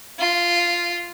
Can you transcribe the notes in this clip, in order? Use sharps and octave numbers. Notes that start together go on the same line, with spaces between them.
F4